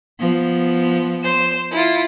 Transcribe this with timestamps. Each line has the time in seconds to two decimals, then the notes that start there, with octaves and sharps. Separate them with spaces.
0.19 F3 B3
1.24 C5 E7
1.71 E4 F4